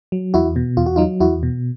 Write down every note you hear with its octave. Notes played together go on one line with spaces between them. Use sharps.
F#3
E2 E4 F#4
B2
E2 F4
F#4
F#3 D#4 F4
E2 E4 F#4
B2